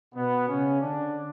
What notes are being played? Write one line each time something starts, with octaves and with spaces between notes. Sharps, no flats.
B2 B3
C#3 C#4
D3 D4